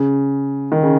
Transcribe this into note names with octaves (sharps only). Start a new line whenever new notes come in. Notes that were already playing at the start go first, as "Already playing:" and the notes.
Already playing: C#3
D#3
C#3